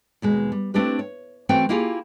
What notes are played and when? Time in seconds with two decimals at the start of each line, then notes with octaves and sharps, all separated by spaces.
0.22 D#2 B2 G#3
0.52 G3
0.74 A3 C4 D4 E4 G4 B4
0.99 C#5
1.49 E3 A3 C4 C#4 F#4 G5
1.69 A#3 E4 F4 G4 G#4